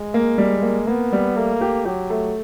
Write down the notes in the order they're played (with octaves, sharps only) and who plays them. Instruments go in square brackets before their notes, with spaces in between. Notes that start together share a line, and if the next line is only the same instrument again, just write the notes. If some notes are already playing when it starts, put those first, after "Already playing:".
Already playing: [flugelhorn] G#3
[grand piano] A#3
[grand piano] G3 [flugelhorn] G#3
[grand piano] A#3
[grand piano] A#3 [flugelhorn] B3
[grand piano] G3
[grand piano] A3 [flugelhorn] A#3
[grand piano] G4
[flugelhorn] F#3 [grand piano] G4
[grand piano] A3